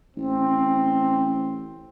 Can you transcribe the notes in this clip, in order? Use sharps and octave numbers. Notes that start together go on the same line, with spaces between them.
A1 C4